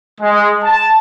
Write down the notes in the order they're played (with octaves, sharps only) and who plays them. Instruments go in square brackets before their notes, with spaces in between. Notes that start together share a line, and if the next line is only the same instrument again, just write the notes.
[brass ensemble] G#3
A5